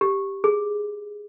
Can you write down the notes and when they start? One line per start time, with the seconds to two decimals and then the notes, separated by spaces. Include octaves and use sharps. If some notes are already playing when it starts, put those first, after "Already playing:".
0.01 G4
0.44 G#4